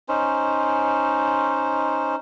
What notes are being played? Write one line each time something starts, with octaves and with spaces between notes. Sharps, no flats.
C#4 D#4 C5